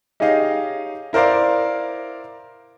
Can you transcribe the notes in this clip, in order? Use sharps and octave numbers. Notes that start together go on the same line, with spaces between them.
D#4 G4 G#4 C#5 D#5 F5
E4 A#4 C5 D5 F5